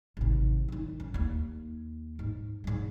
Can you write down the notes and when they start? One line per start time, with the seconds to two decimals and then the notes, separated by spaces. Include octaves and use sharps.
0.17 G#1 C3
0.69 D#3 D#4
1.00 C#2
1.14 D#2 A#3
2.19 G#2
2.64 G#2 G#3